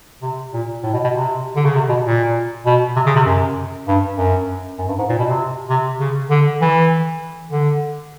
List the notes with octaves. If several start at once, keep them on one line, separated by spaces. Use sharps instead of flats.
C3
A#2
A2
B2
B2
C3
D3
C#3
C3
B2
A#2
B2
C3
C#3
C3
F#2
G2
F#2
F#2
G2
G#2
A#2
B2
C3
C3
C#3
D3
E3
D3